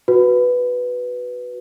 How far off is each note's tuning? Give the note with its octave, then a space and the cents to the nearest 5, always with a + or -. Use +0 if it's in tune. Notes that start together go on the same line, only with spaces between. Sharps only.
F#4 +0 B4 +0